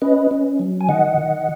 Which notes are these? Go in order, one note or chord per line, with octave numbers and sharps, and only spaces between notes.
C#4 B4 D#5
C#4
F#3
G#5
D#3 D#5 F#5
D#3